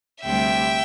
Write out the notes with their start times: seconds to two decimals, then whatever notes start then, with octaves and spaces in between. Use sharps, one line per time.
0.25 D2 C3 G3 E5 G5